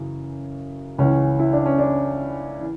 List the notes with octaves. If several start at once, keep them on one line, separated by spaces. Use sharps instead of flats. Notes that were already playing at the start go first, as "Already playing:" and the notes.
Already playing: F#2 C#3 E3
C#2 C#3 E3 C#4
E4
D4
C#4
D4
E3